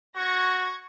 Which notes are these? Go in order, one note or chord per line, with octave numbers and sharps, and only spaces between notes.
F#4 C#6 G#6 A#6